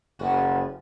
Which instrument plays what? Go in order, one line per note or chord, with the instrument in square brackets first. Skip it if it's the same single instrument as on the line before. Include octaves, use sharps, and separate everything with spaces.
[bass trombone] F#1 [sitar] F3 F#4